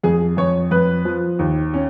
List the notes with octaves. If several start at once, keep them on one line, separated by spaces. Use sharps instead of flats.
F2 G#4
F2 C#5
F2 B4
F3
D#2
C#4